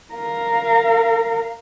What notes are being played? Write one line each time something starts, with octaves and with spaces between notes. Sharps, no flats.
A#4 F5